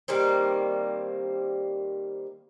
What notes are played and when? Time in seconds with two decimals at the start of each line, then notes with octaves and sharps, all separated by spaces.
0.08 D#3 G3 A#3 C4